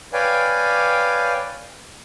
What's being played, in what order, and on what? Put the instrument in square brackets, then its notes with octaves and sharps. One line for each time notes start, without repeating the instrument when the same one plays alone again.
[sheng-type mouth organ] B4 C#5 D5 F5 G5 G#5